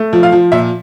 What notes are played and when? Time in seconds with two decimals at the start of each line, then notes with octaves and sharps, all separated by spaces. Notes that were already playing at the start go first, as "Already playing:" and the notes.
Already playing: A3
0.13 F3
0.23 F5
0.32 F3
0.52 A#2 E5